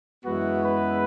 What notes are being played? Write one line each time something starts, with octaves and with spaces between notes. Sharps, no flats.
F#2 E3 G#3 B3 E4 F#4
B4